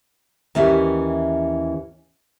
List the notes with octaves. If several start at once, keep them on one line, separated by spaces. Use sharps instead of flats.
D#2 E3 C#4 G4 E5